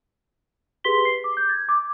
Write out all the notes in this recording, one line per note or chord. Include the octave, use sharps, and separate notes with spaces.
G4 G#4 B4 C6 B6 G7
C7
D6
G6
G#6 A6
D6